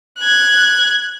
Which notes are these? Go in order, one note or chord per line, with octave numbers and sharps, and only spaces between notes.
F#6 G#6